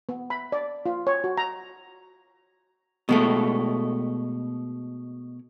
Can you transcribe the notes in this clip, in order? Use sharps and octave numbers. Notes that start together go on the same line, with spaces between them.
B3
B5
D5
F4
C#5
F#4
A#5
B2 G#3 A3